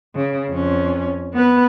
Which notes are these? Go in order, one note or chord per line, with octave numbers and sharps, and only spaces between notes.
C#3
F2 C#4
B3 B4